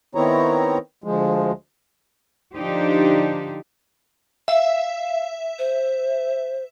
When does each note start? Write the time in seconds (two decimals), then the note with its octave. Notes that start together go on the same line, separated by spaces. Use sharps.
0.15 D#3 B3 C4 E4 C#5 A#5
1.04 D2 F3 G#3
2.54 D3 F3 D4 D#4 G4 C5
4.48 E5 F5
5.58 C5